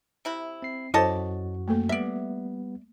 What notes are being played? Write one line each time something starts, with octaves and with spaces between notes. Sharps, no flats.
C3 E4 B5
C4 C7
F#2 E4 F#4 A4 C5 C#5 D#5 A5
A3 A#3 A4
G3 B3 D5 E5